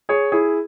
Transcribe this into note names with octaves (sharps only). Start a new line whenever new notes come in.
G#4 C#5
E4 G#4